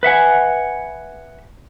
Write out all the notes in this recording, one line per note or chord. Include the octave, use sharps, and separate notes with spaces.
B4 E5 F#5 G#5